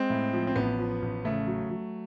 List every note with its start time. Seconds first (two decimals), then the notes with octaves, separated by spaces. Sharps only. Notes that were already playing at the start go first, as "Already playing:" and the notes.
Already playing: G#3 C4
0.10 A2
0.33 F3
0.47 C4
0.56 A1 B3
0.79 F3
1.02 A1
1.25 C#3 A3
1.47 F#3
1.70 F#3